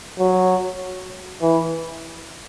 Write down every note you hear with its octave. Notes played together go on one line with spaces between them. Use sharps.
F#3
E3